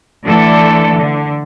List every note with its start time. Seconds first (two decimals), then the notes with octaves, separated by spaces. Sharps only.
0.25 D3 E3 A3 A4 D5
0.96 D3